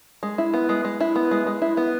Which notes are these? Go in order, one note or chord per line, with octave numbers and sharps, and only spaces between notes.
G#3
E4
B3
G#3
G#3
E4
B3
G#3
G#3
E4
B3